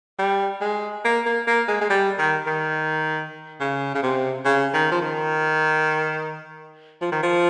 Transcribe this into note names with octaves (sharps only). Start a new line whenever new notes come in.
G3
G#3
A#3
A#3
A#3
G#3
G#3
G3
D#3
D#3
C#3
C#3
C3
C#3
D#3
F3
D#3
F3
D#3
F3